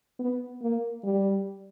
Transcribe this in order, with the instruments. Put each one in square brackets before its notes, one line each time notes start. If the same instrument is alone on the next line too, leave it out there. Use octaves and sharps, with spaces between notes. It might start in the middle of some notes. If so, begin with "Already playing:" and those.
[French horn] B3
A#3
G3